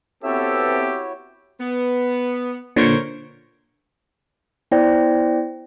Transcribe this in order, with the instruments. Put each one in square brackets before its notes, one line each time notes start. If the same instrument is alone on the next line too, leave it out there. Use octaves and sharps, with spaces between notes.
[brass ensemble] B3 C4 A4 [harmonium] E4 F#4 C#5 [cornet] G4 [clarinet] E5
[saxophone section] B3
[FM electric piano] A#2 D3 [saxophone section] A#4 C5 C#5
[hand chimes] B3 E4 C5 D5 G5 A#6